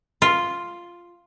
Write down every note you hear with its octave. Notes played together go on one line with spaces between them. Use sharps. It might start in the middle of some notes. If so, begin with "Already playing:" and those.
F4